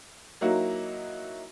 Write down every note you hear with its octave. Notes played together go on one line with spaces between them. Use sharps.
F#3 A#3 D#4 E4 F#4